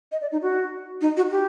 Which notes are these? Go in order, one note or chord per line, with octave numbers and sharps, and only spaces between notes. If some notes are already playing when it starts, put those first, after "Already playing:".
D#5
D5
D#4
F#4
D#4
F#4
G4